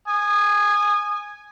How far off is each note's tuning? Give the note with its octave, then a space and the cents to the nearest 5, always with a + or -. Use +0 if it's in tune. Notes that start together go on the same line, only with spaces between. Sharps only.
G#5 +0 D#6 -25